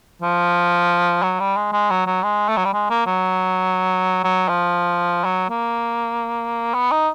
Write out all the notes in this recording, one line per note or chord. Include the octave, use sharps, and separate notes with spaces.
F3
F#3
G3
G#3
G#3
F#3
F#3
G#3
A3
F#3
G3
G#3
A#3
F#3
F#3
F3
F#3
A#3
B3
D#4